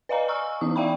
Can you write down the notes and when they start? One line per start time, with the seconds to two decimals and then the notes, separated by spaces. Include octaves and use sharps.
0.09 B4 D5 D#5 F5 G#5 A#5
0.28 G#5 A#5 C#6 E6 F6
0.61 E3 B3 D#4 E4 D#6
0.76 D5 E5 F5 G5 A#5 B5